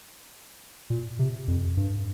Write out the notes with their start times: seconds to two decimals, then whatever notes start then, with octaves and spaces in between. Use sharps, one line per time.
0.90 A#2
1.19 C3
1.48 F2
1.77 G2